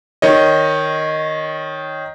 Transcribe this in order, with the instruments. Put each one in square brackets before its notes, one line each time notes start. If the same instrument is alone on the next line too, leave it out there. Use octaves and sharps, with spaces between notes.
[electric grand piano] D#3 C#5 D#5